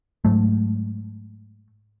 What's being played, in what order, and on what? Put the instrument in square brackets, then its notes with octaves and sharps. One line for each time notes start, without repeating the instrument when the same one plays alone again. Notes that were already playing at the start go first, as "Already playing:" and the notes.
[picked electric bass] G#2 F#3 A3